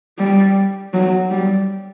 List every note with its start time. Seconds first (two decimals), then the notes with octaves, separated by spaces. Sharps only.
0.19 G3
0.94 F#3
1.31 G3